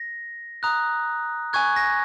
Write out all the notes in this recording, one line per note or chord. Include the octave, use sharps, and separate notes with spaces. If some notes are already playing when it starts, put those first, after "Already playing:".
Already playing: A#6
A#5 D#6 F#6
G#5 C#6 F#6 G#6
A#6